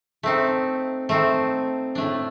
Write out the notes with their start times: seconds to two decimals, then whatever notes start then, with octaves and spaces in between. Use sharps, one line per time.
0.23 A3 C4 D#4
1.09 A3 C4 D#4
1.95 A2 A3 D4